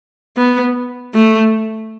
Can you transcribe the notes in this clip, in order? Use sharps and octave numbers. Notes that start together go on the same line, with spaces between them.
B3
A3